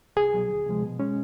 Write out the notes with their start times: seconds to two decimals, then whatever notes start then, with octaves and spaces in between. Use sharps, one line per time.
0.16 C2 G#4
0.34 B2 F#3
0.50 D2
0.66 C3 F3 G#3
0.83 B2
0.99 G#3 C#4